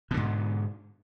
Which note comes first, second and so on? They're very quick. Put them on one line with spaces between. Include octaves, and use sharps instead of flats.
B2 D3 G#2